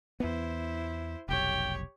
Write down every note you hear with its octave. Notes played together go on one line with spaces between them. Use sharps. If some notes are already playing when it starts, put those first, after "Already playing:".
E2 B3 E4 C5
F1 B1 G4 C#5 G5